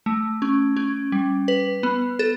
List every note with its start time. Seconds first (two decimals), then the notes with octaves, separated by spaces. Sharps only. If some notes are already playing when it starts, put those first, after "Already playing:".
0.06 A3
0.42 C#4
0.76 C#4
1.12 G3
1.48 B4
1.83 B3
2.19 A4